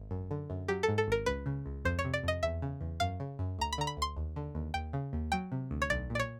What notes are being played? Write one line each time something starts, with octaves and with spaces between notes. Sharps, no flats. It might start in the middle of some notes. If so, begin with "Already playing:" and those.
Already playing: G#1
F#2
D3
F#2
F#3 G4
A4
G#2
A4
G#1 A#4
C#2 B4
C#3
C#2
F2 C5
C#5
C3
D5
F2 D#5
E2 E5
C#3
E2
F#2 F5
C#3
F#2
D2 A#5
B5
D3 A#5
B5
D2 C6
D#2
D3
D#2
D#2 G5
C#3
D#2
F#3 G5
C3
D2
C#5
B1 D5
A#2
D5
C#5